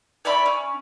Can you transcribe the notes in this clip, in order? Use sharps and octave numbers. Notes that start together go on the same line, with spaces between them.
C#5 D5 E5 B5
C#4